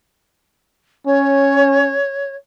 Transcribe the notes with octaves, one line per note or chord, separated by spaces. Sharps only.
C#4 C#5